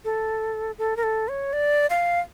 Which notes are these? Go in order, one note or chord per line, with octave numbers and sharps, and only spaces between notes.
A4
A4
A#4
A4
C#5
D5
F5